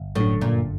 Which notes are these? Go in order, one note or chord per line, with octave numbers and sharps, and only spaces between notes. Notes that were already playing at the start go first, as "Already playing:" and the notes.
Already playing: G1
F#2 A2 D3
G1 A#2